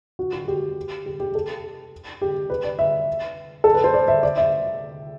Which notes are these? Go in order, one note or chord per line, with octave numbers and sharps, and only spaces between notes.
F#4
F#4
G4
G4
G4
A4
G4
B4
D5
E5
A4
B4
C5
D5
E5
D5
E5